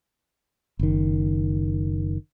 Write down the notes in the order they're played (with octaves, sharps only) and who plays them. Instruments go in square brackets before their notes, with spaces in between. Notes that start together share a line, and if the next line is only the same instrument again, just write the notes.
[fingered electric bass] F#1 D#3